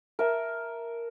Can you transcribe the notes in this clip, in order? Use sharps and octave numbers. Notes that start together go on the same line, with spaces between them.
A#4 E5 A5